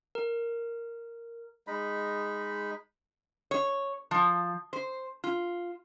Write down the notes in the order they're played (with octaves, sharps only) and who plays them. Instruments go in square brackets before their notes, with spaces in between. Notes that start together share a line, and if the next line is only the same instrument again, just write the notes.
[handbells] A#4
[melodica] G#3 D#4 B5
[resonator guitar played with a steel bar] C#5
F3
C5
F4